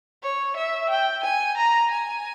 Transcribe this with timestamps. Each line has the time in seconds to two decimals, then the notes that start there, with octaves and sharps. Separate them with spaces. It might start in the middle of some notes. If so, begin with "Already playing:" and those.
0.23 C#5
0.57 E5
0.90 G5
1.24 G#5
1.58 A#5
1.91 G#5